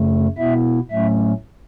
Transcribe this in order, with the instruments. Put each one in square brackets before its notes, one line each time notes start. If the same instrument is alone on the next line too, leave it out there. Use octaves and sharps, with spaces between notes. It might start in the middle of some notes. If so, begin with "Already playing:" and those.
Already playing: [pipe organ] F#2 C#3 A3
B2 B3 E4 E5
A2 F#3 A3 C#4 E5